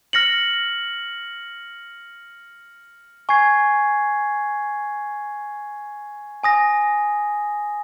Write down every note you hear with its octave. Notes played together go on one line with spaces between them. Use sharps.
F6 A#6 C#7 F#7
G#5 C#6 G#6 C7
G#5 D#6 A#6